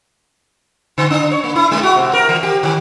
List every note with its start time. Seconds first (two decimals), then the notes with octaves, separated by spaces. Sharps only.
0.98 D3
1.11 D4
1.31 C#5
1.44 A#3
1.55 E4
1.71 G#3
1.83 F#4
1.96 C3
2.13 A#4
2.29 E3
2.43 G4
2.63 D#3